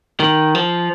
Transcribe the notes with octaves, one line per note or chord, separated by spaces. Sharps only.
D#3
F3